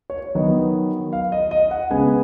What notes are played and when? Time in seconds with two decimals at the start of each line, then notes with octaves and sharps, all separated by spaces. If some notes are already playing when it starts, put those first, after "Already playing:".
0.10 C#5
0.35 D#3 F#3 B3 D#5
1.13 F5
1.32 D#5
1.51 D#5
1.71 F#5
1.90 C#3 G#3 B3 G#5